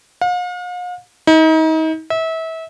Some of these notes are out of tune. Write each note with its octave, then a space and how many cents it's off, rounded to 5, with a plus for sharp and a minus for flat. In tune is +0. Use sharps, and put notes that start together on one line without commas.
F5 +45
D#4 +35
E5 -30